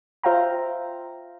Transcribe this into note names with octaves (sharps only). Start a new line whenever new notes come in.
F4 C5 E5 F5 G5 A#5